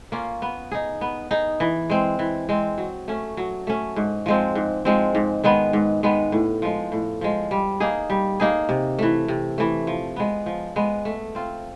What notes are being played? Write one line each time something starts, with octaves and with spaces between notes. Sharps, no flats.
A#3 C#4 F4
B3
D#4 G#4
B3
D#4 G#4
E3
G#3 C4
E3
G#3 C4
F#3
A3 C#4
F#3
A3 C#4
G#2
F3 G#3 C4
G#2
F3 G#3 C4
G#2
D#3 G#3 B3
G#2
D#3 G#3 B3
A2
F3 G#3
A2
F3 G#3
G3
A#3 D#4 G#4
G3
A#3 D#4 G#4
C3
E3 A3
C3
E3 A3
F3
G#3 B3
F3
G#3 B3
A3
C4 F4